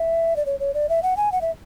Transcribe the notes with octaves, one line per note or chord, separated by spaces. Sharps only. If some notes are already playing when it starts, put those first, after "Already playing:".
Already playing: E5
D5
C#5
C#5
D5
E5
F#5
G#5
F#5
E5